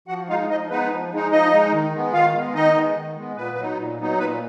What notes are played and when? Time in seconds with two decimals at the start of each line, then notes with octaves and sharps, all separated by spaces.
0.08 F3 F#4 F#5
0.28 G#3 D#4 F4 F5
0.49 F3 D#4 D#5
0.69 G#3 B3 D#4 B4
0.90 F3
1.12 G#3 D#4
1.31 F3 D#4 D#5
1.52 G#3 D#4
1.73 D#3
1.93 G#3 B3
2.13 D#3 F4 F5
2.33 G#3 B3
2.54 D#3 D#4 D#5
2.74 G#3 B3
2.96 D#3
3.16 G#3 B3
3.36 A#2 B3 B4
3.57 F#3 B3 D#4
3.78 A#2
3.99 F#3 B3 D#4
4.18 A#2 B3 B4